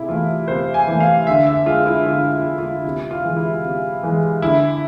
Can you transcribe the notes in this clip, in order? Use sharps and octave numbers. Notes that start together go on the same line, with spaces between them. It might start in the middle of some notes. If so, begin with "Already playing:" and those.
Already playing: C3 E4 G#4
E3 A3 F4
C3 C5
G#5
E3 A3
F5
D3 E5
E5
G#3 F4
E4
D3 F4
F4
G#3
F4
C3 E4
F4
E3 G#3
E4
C3
E3 G#3
D3 E4